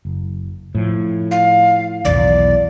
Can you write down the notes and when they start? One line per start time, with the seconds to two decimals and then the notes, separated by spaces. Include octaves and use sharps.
0.05 F#1
0.75 A2 F3
1.31 F5
2.05 B1 E2 D#3 D5